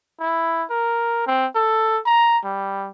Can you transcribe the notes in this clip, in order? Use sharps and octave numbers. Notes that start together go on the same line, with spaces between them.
E4
A#4
C4
A4
A#5
G3